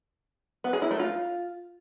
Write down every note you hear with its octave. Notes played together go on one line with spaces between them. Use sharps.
B3
G#4
E4
A3
F4